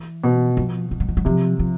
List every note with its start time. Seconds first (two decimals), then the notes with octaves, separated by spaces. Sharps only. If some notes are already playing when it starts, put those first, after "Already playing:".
Already playing: E3
0.24 B2
0.57 F3
0.91 F3
1.00 F#3
1.09 F3
1.17 F#3
1.25 C3 F3
1.59 F3